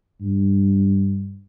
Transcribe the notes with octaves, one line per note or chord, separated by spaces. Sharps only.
G2